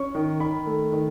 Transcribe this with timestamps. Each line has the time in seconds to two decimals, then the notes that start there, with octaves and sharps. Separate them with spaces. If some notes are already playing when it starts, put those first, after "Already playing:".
Already playing: C#4 C#6
0.15 D#3
0.40 D#3 B5
0.66 A3
0.92 D#3